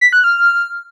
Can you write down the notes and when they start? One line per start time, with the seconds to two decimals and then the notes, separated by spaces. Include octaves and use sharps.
0.01 B6
0.13 F#6
0.24 F6